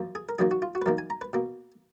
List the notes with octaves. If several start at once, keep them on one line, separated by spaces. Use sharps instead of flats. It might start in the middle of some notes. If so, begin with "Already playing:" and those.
Already playing: F#2 F3 A#3
G#4
A#4
F#2 D#3 F#3 A#3 G#4
F#4
F4
F#4
B4
F#2 D#3 A#3 A#4
G#5
A#5
B4
B2 A#3